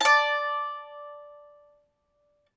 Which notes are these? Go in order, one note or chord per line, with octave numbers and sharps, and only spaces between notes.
D5 A5